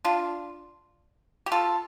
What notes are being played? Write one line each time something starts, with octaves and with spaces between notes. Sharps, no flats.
D4 F4
G4
F4 A4